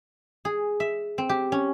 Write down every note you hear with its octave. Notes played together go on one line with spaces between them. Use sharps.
G#4
E5
C4
G4
C#4